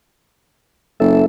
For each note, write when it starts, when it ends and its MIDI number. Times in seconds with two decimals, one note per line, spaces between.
1.00 1.24 30
1.00 1.26 69
1.00 1.26 76